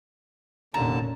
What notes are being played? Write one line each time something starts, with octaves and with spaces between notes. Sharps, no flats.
F1 D#2 A#2 D3 C#4 A5 A#5